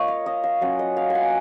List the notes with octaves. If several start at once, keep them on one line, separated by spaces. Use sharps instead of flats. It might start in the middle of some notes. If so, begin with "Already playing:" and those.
Already playing: A#3 F4 C#5 D#5
F5
D#5
F5
F#3 C#4 F4 F#5
D#5
F5
F#5 G#5